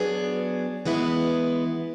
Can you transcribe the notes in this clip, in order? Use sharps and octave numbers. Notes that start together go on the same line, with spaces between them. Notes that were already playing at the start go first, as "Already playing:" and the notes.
Already playing: F#3 B3 D4 G#4
E3 G#3 B3 E4